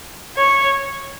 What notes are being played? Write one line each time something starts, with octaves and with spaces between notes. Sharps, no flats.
C#5